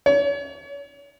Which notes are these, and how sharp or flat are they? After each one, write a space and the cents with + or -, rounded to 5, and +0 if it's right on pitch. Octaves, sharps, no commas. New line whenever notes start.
C#5 +40